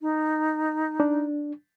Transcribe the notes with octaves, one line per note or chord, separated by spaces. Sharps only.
D#4
D4